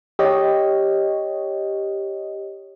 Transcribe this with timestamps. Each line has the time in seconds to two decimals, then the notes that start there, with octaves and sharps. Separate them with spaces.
0.19 G4 C#5 D#5